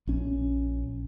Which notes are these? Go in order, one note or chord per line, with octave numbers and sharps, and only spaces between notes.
A#1 C#4